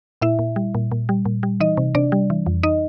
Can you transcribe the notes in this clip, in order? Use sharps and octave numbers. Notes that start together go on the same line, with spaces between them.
A#2 E4 E5
A#2
G3
A#2
A#2
G3
A#2
G3
E3 D#4 D#5
C3
C3 D4 D5
G3
E3
F2
D#4 D#5